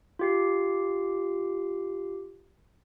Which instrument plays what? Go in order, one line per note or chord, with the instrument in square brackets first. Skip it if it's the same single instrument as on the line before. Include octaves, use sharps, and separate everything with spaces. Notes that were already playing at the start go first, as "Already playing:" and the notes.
[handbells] F4 G4 C7